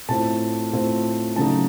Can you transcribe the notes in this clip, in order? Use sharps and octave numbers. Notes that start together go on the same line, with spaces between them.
A2 A3 C4 F4 A5
A2 A3 C4 F4
C#3 F#3 A3 D#4 A5